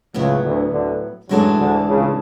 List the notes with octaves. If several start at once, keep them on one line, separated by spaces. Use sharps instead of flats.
C#2 A2 C#3 F#3 B3
D2 D3
D2 D3
F#2 A2 E3 F#3 G#3 D4 A4
D2 D3
C#2 C#3